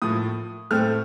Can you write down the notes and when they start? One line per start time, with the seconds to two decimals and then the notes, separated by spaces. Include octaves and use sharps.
0.02 A2 F3 A#3 D#6
0.71 A2 A3 C4 F6